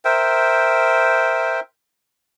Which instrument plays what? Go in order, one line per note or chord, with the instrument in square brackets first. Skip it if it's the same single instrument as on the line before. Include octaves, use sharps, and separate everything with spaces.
[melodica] A#4 C5 E5 G5